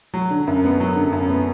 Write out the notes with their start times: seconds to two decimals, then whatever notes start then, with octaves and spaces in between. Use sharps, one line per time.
0.14 F#3
0.31 D3
0.47 F#2
0.64 B3
0.80 F#3
0.96 D3
1.13 F#2
1.29 B3